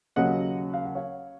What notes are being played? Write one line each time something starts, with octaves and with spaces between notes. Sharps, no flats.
D#2 C#3 F#3 D#5 F#5
F5
F#5
C#5 F5